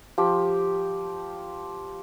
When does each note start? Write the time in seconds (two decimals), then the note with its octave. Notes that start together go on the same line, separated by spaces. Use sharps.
0.18 F3 G4